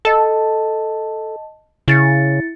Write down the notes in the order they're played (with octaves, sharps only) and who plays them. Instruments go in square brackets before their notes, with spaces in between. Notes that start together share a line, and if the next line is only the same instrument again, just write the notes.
[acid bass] A4 [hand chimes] D#5 A5
[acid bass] C#3 [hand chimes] E4 A6 C#7